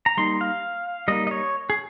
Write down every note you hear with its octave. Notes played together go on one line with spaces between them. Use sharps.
A#5
G3 A#3 D#4 C6
F5
G3 A#3 D#4 D#5
D#5
C#5
G#4